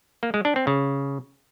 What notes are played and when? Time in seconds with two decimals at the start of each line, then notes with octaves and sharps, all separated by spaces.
0.23 A#3
0.34 G#3
0.45 D4
0.56 C4
0.67 C#3